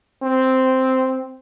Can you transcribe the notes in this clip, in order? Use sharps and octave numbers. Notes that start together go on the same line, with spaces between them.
C4